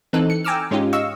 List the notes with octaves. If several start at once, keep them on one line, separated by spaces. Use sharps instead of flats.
E3 C4 D#4 A4 F#6
C#7
G5 G#5 A#5 D6 E6 F6
G#2 G#3 C#4 D#4 F4 G4
D#5 F5 C#6 E6